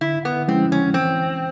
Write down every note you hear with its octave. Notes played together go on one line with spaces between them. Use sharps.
D3 E4
B3
F3 G#3 C4 C#4 E4
C#4
E3 C4